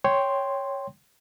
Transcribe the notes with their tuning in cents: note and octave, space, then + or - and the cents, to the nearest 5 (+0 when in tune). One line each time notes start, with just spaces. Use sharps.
C#5 +0 G5 +0 C6 +0